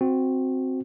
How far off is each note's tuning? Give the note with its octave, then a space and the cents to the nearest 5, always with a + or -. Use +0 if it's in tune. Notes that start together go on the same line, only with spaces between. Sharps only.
C4 +0 F#4 -10